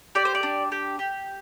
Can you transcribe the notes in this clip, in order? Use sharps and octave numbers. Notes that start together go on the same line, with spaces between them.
G4 D5
C5
D5
D4
G4
G4